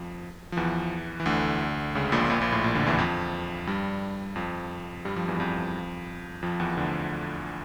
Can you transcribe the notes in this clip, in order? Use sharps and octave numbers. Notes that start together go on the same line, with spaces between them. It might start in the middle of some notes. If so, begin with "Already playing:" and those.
Already playing: F2 F3
F3
E2 E3
E3
D2 D3
C#2 C#3
A#1 A#2
A#1 A#2
A#1 A#2
A2
A#1 A#2
D2 D3
E2 E3
F2 F3
G2 G3
F2 F3
G2 G3
F2 F3
E2 E3
F2 F3
F2 F3
E2 E3
D2 D3